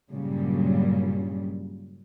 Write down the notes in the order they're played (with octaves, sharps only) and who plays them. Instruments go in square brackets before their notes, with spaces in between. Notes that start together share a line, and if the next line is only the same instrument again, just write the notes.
[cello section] G2 A#2 C#3 F#3 G3